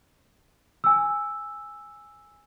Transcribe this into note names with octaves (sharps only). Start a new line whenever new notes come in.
G#5 E6